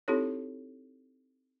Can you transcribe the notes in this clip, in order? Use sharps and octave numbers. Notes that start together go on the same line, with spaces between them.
C4 D#4 E4 G4 A4 C#5